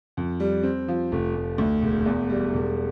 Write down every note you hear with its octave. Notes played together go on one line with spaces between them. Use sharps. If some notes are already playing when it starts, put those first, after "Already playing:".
F2
G3
C4
F3
F1
F1
D2
E1
E2
G3
E1